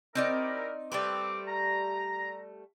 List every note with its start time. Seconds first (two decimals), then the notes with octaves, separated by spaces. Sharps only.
0.15 C4 D#4 E4 G4 A#4 D5
0.92 G3 A3 C4 B4 D6
1.48 A#5